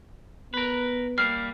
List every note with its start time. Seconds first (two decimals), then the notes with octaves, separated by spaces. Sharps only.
0.54 B3 A#4 B4
1.18 G3 A#3 F6 C7